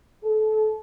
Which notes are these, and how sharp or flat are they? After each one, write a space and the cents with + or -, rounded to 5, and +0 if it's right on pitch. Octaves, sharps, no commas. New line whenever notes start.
A4 -30